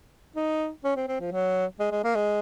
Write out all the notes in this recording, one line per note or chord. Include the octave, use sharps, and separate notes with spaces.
D#4
C#4
C4
C4
F3
F#3
G#3
G#3
A#3
G#3